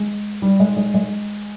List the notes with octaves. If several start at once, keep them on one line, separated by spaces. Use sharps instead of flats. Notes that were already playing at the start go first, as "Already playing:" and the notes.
Already playing: G#3
G3
G#3
G#3
G#3